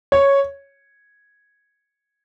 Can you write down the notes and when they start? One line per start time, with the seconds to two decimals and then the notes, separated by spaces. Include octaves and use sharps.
0.12 C#5